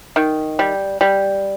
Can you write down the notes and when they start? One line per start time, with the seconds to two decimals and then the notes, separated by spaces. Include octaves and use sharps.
0.16 D#3
0.59 G3
1.01 G3